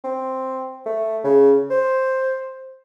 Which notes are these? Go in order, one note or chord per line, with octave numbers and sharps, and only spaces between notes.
C4
A3
C#3
C5